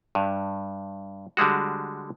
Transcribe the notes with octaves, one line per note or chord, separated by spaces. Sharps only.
G2
D3 G3 G#3 F#4